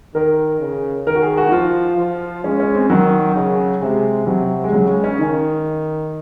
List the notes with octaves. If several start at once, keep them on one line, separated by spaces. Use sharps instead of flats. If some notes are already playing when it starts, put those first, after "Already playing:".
D#3 A#4
C#3
D#3 A#4
F#4
G#4
F#4
D#4
F3 F4
F3
G#3 C#4
C#4
C4
D#3 F#3
C#3
C3 G#3
C3 F#3
G#3
C#3 F#3
G#3
C#4
D#3 D#4